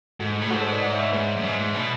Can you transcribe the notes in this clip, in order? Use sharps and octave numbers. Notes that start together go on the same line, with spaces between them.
G#2 F#4 A4
A2
G#4
G#2 F#4 A4
A4 C#5
B4 D5
D5 F#5
C#5 E5
C#5 E5
G#2 G#4 B4
F#2
G#2
G#2
B2